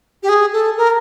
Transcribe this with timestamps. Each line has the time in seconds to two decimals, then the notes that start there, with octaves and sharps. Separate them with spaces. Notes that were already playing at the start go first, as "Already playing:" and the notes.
0.23 G4
0.29 G#4
0.53 A4
0.77 A#4